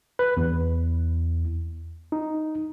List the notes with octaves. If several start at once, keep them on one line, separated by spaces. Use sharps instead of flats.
B4
E2
D#4